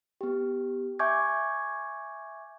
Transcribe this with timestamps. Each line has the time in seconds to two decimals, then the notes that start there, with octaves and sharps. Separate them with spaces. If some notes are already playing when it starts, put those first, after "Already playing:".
0.21 B3 G4
0.99 E5 G#5 C#6 D6 G6 G#6